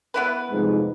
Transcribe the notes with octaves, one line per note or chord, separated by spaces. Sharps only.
B3 E4 B4
C2 F2 G#2